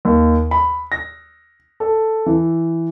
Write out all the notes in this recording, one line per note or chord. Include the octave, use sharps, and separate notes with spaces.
D#2
B5
A#6
A4
E3